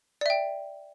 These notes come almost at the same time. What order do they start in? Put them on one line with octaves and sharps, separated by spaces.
D5 E5 G5